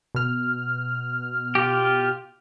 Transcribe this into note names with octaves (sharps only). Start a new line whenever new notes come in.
B2 F6
F4 G4